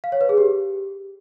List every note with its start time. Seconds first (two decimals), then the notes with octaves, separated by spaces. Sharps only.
0.04 F5
0.12 C#5
0.21 B4
0.29 G#4
0.38 G4